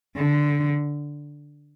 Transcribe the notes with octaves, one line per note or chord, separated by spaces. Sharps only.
D3